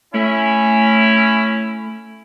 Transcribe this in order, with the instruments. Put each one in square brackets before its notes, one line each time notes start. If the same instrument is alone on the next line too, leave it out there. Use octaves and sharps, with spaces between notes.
[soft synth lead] A3 [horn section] C#4 E4